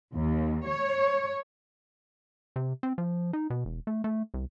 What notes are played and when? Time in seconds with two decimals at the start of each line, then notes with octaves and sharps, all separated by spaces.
0.13 D#2
0.66 C#5
2.56 C3
2.83 C4
2.98 F3
3.33 D#4
3.50 B2
3.65 E1
3.87 A3
4.04 A3
4.34 C2